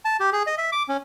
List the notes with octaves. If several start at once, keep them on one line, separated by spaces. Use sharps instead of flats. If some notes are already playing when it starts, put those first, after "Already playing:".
A5
G4
G#4
D#5
E5
D6
C#4